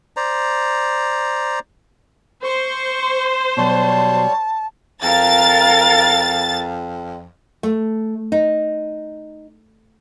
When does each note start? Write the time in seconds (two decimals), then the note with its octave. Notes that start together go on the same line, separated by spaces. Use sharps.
0.17 C5 D5 A#5
2.44 C5 C#6
3.57 B2 F#3 G3 C#5 A5
5.03 F2 A#4 F5 A6
7.63 A3
8.32 D#4